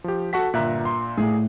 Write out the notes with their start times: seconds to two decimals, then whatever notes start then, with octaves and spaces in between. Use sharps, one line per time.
0.04 F3 G4
0.33 F#4 A4 F#5 A5 C#6 B6
0.54 G1 A#2 E5 A#5 F#6
0.85 C6
1.18 A2 G#4